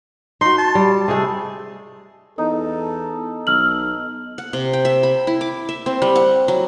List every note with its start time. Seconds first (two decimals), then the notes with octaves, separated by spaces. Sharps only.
0.41 D#4 F#4 C6
0.58 A5
0.75 G3
1.08 C3 G#3 A3 G#4
2.38 E2 D#4 A4
3.47 B1 E6 F6 F#7
4.38 F#5
4.53 C3
4.73 G5
4.85 E5
5.03 B5
5.27 E4
5.41 D6
5.69 E5
5.86 C4
6.02 G3
6.16 F#5
6.48 F#3